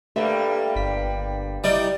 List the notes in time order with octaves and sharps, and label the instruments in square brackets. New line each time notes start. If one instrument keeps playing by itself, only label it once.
[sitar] G2 G3 A#3 [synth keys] A3 E5
[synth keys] G1 B6
[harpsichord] G3 D#4 [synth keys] E4 D6 [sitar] D5